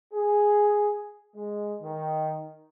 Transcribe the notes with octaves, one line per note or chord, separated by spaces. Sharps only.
G#4
G#3
D#3